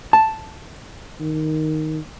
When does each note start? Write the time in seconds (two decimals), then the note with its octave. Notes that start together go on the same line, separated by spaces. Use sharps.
0.13 A5
1.20 D#3